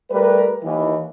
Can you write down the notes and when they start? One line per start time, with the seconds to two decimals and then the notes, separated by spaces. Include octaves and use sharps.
0.10 G3 A3 A#4 B4
0.63 D#2 D#3 E3